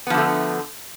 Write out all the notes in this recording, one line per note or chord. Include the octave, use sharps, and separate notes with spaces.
D3 F3 A3 B3